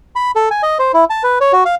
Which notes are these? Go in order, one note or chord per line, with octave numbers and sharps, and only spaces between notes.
B5
A4
G#5
D#5
C5
E4
A5
B4
C#5
F#4
F5